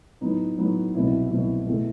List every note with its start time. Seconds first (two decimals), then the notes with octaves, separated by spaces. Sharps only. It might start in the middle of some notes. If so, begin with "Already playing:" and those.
0.21 A2 F#3 B3 D#4
0.57 A2 F#3 B3 D#4
0.94 C2 B2 F#3 C4 E4
1.30 C2 B2 F#3 C4 E4
1.67 E2 B2 A3